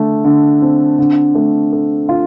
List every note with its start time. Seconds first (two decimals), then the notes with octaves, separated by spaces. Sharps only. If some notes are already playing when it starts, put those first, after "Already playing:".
Already playing: D3 A3
0.24 D3
0.61 C4
0.99 D3
1.35 A3
1.72 A4
2.09 F4